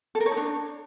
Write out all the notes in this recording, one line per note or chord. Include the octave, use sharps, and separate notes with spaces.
A4
A#4
C#5
D#4
D4